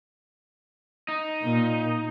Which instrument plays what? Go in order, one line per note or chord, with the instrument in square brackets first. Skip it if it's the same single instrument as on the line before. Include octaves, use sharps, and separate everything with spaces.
[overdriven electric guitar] D#4
[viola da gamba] A#2